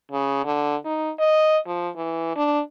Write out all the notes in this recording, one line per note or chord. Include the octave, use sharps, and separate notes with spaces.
C#3
D3
D#4
D#5
F3
E3
D4